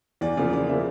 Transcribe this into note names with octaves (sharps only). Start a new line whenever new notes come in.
E2 D5
C#3 F3 A#3 D5
E2 D5
C#3 F3 A#3 E5